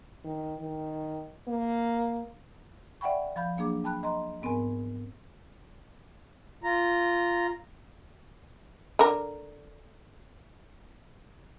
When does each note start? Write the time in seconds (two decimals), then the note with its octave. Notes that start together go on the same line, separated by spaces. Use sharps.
0.24 D#3
0.60 D#3
1.48 A#3
3.01 D5 E5 F#5 G5 B5 C#6
3.36 F3 F5 B5 G6
3.57 F#3 A#3 D4 G#4 D6
3.84 G5 A5 B5 F#6
4.03 D#5 A#5 C6
4.42 G#2 B3 C4 A#4 G#5
6.64 F4 A#5
8.99 D3 A#4